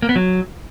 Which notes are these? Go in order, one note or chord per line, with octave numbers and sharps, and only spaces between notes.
A#3
B3
F#3